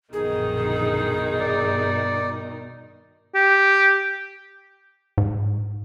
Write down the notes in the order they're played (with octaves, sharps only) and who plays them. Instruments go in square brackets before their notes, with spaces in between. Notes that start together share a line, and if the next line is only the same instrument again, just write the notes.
[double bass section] A#1 F#2 D3 [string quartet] B2 D#3 D#4 [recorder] G#4
[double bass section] G2 [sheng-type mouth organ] D5
[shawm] G4
[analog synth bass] G#2